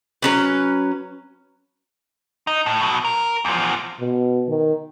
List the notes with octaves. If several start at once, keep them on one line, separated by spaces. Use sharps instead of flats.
F#3 C#4 B4
D#4
A2
B2 F#3
A#4
E2 F3
B2
D#3